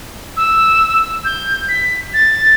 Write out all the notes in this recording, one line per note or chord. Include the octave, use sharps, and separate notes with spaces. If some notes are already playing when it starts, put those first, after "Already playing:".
E6
G6
B6
A6